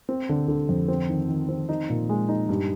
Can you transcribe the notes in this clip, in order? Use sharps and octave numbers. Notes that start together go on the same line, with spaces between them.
C4
D3
D3
F2
C4
D#3
D#3
C4
D#4
A#2
G#3
D#4
G2